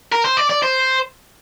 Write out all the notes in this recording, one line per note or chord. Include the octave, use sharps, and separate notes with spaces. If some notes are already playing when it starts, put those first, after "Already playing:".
A#4
C5
D5
D5
C5